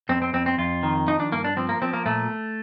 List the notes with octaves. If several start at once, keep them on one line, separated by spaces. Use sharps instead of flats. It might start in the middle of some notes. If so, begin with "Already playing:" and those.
F2 C4
C4
F2 C4
C4
F2 F4
D#3
F3 D#4
D4
G2 A#3
D4
F3 C4
A#3
F3 C4
A#3
A#2 A3